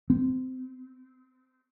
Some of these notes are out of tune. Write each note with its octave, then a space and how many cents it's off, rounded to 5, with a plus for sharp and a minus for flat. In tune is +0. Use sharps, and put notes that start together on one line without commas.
C4 -25